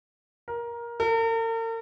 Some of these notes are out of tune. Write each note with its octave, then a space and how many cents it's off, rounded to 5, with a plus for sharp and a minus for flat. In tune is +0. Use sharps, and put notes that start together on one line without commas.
A#4 +15
A#4 -45